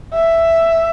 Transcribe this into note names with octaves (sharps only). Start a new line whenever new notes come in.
E5